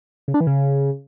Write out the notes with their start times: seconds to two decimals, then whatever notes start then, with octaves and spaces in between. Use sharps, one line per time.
0.28 C#3
0.34 D4
0.41 E3
0.47 C#3